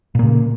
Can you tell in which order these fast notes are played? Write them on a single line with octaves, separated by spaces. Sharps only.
A#2 A#3 C#3